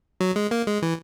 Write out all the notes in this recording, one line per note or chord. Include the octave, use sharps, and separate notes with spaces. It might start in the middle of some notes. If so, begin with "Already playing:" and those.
F#3
G#3
A#3
G#3
E3